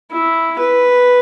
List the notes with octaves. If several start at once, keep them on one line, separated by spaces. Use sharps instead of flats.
E4
B4